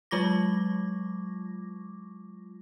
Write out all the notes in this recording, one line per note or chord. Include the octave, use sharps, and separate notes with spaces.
F#3 G#3 F4 C#6 D6 A#6